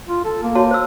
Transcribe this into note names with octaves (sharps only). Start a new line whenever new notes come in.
F4
A4
A#3
F#4 C#5 A5
C5 E6